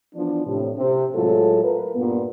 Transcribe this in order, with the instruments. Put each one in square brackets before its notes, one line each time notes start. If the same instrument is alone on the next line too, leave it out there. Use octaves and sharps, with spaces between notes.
[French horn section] E3 F3 B3 D4
A2 C3
C3
A2 F#3 G#3 E4 F4 A4
A#4 B4
G2 A#2 A#3 B3